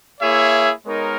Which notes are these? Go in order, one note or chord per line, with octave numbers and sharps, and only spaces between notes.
A#3 E4 G#4 C#5 E5
G#3 B3 D#4 A#4 C#5